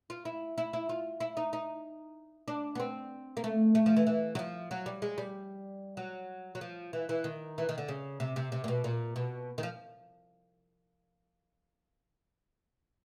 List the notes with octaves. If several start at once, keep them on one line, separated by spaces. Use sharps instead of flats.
F4
E4
E4
E4
F4
E4
D#4
D#4
D4
B3
C4
A#3
A3
A3
F3
E3
E3
F#3
F3
F#3
G3
G#3
G3
F#3
F#3
F3
E3
E3
D#3
E3
D#3
D3
C#3
C3
C3
C3
A#2
B2
A#2
B2
D#3
F3